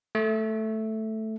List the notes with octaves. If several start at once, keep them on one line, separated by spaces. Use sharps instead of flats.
A3